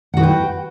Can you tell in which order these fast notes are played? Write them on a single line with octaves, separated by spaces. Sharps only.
F#5 F#4 B4 G5